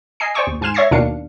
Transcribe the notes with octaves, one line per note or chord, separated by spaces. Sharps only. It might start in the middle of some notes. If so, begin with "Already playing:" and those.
D#5 G#5 C7
C5 D5 G5 G#5 C#6 D#6
D#2
G#2 G#5 C6 F6 E7
C#5 E5 C#6 G#6 A#6 C7
D#2 B2 D#3 D4 F5 C#7